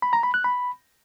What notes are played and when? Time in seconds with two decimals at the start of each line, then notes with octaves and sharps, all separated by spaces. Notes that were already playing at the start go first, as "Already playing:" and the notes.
0.02 B5
0.13 A#5
0.23 B5
0.34 F#6
0.44 B5